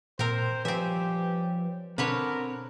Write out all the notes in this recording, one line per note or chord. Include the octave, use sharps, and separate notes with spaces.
A#2 C4 A#4 C5
F3 G3 C4 G4 B4 C#5 E5 G#5
B2 D3 C4 A#4 B4 C#5 A5